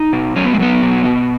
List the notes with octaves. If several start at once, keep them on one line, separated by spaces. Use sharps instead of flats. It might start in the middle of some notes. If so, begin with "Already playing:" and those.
Already playing: D#4
B2
F#3 C#4
B3
G#3
F#3 B3
B2
B2